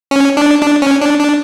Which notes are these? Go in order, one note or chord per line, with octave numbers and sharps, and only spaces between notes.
C#4
D4
D4
C#4
D4
D4